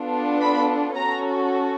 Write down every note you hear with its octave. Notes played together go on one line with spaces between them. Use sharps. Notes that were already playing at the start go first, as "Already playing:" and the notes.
Already playing: B3 D4 F4 A4
B5
C#4 F#4 A4 A#5